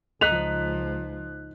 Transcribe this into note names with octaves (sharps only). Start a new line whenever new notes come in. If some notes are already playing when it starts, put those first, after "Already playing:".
C#2 F3 D#4 F#6 B6 F7